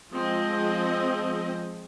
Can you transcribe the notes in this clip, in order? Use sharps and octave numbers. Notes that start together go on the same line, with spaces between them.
F3 G#3 C4 D#5